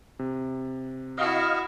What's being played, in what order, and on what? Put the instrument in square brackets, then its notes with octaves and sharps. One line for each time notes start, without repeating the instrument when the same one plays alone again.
[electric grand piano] C3
[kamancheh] E4 F#4 [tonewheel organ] D#5 F5